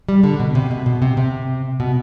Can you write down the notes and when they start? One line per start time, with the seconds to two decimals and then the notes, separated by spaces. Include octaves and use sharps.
0.09 G3
0.23 D3
0.40 B2
0.55 C3
0.71 B2
0.86 B2
1.02 C3
1.17 C3
1.80 B2